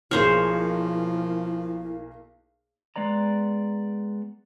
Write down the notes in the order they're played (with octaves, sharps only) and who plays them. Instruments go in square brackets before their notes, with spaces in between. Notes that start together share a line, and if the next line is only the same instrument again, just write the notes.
[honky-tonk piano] B1 A#3 F6 [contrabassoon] F3 [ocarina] E4 [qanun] G#4 C5 C#5
[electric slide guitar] G#3 B3 D5 A#5